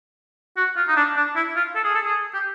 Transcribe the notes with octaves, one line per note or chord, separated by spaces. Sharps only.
F#4
F4
D#4
D4
D4
E4
F4
A4
G#4
A4
G#4
G4